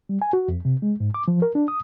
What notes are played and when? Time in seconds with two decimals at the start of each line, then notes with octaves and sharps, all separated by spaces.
0.09 G3
0.22 G#5
0.33 F#4
0.48 F2
0.65 C3
0.82 G#3
1.00 G#2
1.14 D6
1.28 F3
1.42 A#4
1.55 D4
1.68 D#6